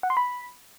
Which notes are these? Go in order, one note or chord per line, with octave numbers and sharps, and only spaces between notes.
F#5
C6
B5